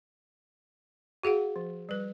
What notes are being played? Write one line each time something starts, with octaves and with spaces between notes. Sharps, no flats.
F#4 G#4 F5 F#5
F3
G3 B4